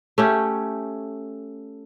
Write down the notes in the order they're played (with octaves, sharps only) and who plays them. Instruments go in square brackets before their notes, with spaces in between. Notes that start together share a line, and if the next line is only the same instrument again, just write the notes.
[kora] A3 C#4 G4